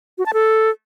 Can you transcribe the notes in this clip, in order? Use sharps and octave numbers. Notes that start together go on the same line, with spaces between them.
F#4
A5
A4